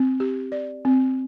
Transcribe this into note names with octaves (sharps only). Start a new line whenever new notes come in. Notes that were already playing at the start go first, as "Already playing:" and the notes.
Already playing: C4
G4
D5
C4